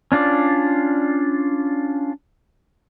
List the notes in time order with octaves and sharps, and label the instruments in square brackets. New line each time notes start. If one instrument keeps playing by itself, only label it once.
[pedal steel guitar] C#4 D4 F4 D5